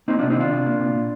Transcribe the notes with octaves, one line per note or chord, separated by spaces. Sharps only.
A#3 C4 D#4
C3 D4 F4
C4 D#4
D#3 D4 F4
C3
A#3
C3
A#2